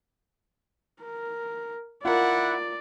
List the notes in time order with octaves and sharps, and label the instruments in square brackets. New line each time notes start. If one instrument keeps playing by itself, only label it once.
[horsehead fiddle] A#4
[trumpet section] E4 F#5 [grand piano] F4 A#4 [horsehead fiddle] D5